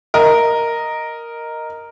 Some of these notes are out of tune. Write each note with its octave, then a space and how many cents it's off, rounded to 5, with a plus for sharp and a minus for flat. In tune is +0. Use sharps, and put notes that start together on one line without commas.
A#4 +0 D#5 +0